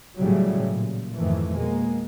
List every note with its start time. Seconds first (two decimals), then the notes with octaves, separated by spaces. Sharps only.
0.17 A2 C#3 E3 F#3 G3
0.71 A#2
1.17 F2 G#2 D#3 E3 A3
1.55 B2 G#3 A#3